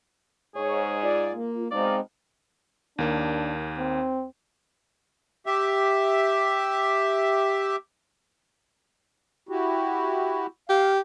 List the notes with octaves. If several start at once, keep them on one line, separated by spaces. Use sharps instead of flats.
G#2 G#4 C#5
F4 D5
A#3
B2 G#3 C4 D#4 D5 F5
D#2 A#3 D4
C4
G4 E5
E4 F#4 G4
G4 F5